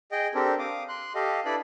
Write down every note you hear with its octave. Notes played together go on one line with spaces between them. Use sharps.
G#4 D#5 G5
C4 D4 G4 A4 A#4
F5 D6 D#6
C6 F#6
G4 A4 D#5 F5
D4 E4 A4 B4 D5 B5